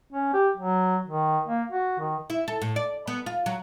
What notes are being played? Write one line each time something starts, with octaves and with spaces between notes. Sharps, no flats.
C#4
G4
F#3
D#3
A#3
F#4
D#3
E4
A4
A2
D5
B3
F4
F#3